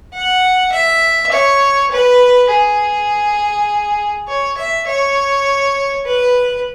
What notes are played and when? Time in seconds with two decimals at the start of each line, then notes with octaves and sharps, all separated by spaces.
0.14 F#5
0.72 E5
1.32 C#5
1.92 B4
2.50 G#4
4.28 C#5
4.58 E5
4.87 C#5
6.06 B4